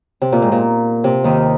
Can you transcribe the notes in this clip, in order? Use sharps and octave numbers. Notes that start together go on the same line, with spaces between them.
C3
A#2
G#2
A#2
C3
D#2 D#3